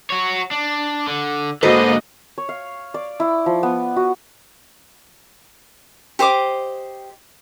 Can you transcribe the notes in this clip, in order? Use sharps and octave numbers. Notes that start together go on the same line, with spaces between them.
F#4 C#5
D4
D3
G#2 D3 A#3 F#4 A4 B4 C5 D#5
C#5
F5
D5
E4
F3
B3
F#4
G4 C5 D#5 D6